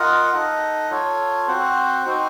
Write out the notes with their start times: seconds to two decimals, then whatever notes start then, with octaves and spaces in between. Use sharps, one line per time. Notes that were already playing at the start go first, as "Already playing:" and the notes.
Already playing: F4 A#4 D#5 F#5
0.33 D#4 A4 D#5 F#5
0.90 F4 A4 C#5
1.48 C4 F#4 C5 F#5
2.06 C4 D#4 F#4 C5